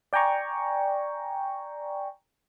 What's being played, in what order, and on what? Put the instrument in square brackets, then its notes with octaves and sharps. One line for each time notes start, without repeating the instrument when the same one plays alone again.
[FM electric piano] D5 G5 G#5 A#5 C#6